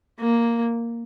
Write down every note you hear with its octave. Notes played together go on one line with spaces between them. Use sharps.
A#3